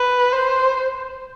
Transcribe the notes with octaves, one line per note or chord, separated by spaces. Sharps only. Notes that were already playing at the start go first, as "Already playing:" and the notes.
Already playing: B4
C5